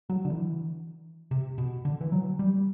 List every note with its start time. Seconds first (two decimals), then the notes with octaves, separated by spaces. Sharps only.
0.09 F#3
0.25 D3
0.30 E3
1.31 C3
1.58 B2
1.85 D3
2.01 E3
2.12 F#3
2.39 G3